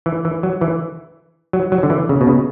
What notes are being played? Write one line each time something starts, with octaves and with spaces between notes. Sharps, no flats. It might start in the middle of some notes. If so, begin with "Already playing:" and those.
E3
E3
F#3
E3
F#3
F#3
D3
E3
C#3
B2
C#3